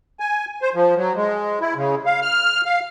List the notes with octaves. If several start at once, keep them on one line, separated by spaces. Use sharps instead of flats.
G#5
C5
F3
F#3
G#3
E4
C#3
F5
F6
F5